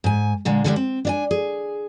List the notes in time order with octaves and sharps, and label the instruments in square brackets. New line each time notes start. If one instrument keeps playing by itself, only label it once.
[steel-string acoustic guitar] G#2 G#5
A#2 D3 G#3
D3 E3 G3 G#3 A#3 D4
C4
D4 D5 G#5
G#4